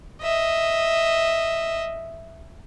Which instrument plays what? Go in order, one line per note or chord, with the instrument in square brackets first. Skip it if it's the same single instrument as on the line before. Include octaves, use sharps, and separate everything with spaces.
[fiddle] D#5 E5